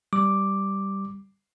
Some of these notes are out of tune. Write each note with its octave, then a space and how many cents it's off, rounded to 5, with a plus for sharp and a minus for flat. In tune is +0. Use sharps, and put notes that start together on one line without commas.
G3 -5 D6 +0